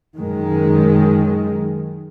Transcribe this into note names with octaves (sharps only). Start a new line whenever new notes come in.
F#2 D#3 G#3